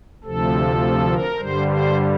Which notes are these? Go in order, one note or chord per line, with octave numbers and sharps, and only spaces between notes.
D2 C3 F3 A4
A#4
G2 D3 G3 C5
C5